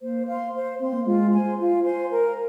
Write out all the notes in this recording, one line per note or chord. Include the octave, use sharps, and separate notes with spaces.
A#3 C5
F5 C6
C5
C4 F5 C6
A#3
G#3 F4
C5 G#5 C6
F4
C5 G#5 C6
A#4